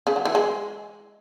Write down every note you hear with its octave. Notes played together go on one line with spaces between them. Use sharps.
C#3
F#3
E3
G#3